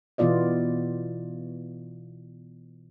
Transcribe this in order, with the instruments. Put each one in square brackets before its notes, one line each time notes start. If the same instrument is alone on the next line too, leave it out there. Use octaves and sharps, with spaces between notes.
[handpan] B2 E3 B3 F4 D5 D#5